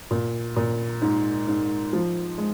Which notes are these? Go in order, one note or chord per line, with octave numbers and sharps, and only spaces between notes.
A#2
A#2
G#2
G#2
F3
G#3